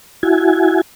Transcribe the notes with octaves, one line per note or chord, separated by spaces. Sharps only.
E4 F#4 G#5